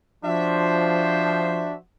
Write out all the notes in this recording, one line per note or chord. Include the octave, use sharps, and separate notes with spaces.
F3 D4 F#4 C5 E5